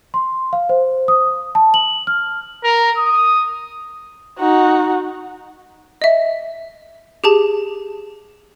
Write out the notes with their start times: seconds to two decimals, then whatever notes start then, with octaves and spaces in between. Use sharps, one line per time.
0.14 C6
0.53 F5
0.69 C5
1.08 D#6
1.55 A5
1.74 F#7
2.07 F6
2.64 A#4
2.97 D#6
4.38 D#4 F#4
6.02 D#5 E5
7.24 G4 G#4 A5